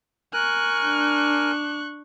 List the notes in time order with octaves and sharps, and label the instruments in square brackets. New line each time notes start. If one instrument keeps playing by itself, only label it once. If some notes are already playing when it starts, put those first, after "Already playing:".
[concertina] A#4 G#5 [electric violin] C#6 F#6
[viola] D4